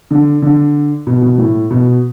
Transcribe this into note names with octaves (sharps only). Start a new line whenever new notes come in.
D3
D3
B2
B2
A2
B2